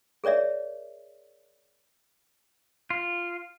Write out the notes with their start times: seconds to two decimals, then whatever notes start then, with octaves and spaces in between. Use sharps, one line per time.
0.24 G#4 A#4 C#5 D5 E5
2.90 F4